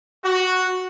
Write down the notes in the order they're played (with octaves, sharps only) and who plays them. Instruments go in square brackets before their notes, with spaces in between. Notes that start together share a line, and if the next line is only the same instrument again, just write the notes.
[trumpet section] F#4